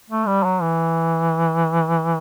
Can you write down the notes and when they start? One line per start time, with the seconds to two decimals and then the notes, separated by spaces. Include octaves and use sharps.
0.10 A3
0.27 G3
0.44 F#3
0.62 E3